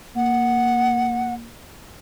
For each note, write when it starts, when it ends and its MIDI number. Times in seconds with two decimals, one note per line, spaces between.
0.16 1.50 58
0.16 1.34 78